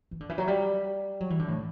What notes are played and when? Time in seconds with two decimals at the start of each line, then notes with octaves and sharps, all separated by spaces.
0.11 E3
0.21 D3
0.29 E3
0.38 F#3
0.48 G3
1.20 F#3
1.30 E3
1.39 D3
1.48 A2